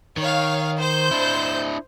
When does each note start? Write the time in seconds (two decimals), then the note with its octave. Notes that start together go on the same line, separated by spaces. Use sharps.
0.17 D#3 C#5 F5
0.78 C5 G6
1.11 D4 E4